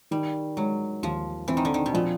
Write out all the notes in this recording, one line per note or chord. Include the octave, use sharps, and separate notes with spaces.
D#3 G3
F#3 G#3
D#2 F3
E3 C4
D#3
D3
D#3
B2
A#2 F3